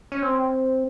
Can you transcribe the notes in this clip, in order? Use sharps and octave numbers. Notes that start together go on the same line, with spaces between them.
C#4
C4